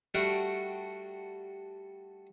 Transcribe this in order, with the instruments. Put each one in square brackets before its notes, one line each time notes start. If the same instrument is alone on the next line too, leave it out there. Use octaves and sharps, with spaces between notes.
[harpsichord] G3 A3 D4 F#4 F#5 G5